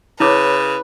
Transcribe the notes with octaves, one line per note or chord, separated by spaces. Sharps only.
C#3 E4 B4 C#5 D6